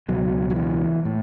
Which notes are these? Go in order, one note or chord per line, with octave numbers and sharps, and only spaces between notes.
C#2 B2 F#3
F#3
E3
A2